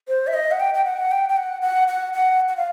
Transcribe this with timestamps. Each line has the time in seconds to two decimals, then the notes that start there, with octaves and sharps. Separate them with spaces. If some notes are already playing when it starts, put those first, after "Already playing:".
0.08 C5
0.27 E5
0.34 D#5
0.51 F#5
0.60 G5
0.74 G5
0.85 F#5
1.11 G5
1.29 G5
1.37 F#5
1.62 F#5
1.88 F#5
2.14 F#5
2.48 F#5
2.57 F5